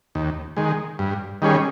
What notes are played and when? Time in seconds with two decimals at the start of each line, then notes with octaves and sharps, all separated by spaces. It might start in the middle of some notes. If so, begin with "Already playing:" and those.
0.15 D#2
0.57 D#3 G#3
0.99 G2
1.42 D#3 G3 C#4 G#4